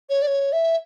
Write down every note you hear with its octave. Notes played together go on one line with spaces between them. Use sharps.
C#5
D5
C#5
E5